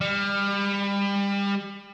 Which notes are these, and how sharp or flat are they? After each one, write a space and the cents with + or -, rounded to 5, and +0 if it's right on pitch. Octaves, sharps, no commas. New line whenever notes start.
G3 +30